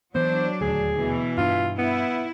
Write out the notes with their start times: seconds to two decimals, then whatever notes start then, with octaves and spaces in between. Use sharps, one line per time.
0.15 E3 F#3 B3 D4 C5
0.61 D#1 D2 G#4
0.95 B2 E3
1.38 G2 D4 F4
1.79 B3 E4